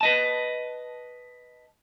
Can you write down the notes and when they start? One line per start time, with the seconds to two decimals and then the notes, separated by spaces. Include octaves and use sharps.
0.01 B4 D#5 A5